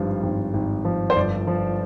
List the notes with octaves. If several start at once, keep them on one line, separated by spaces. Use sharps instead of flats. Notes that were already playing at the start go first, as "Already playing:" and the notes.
Already playing: G#1 G2 F3
G#1
G#1
F3
C5
G1 D5
F3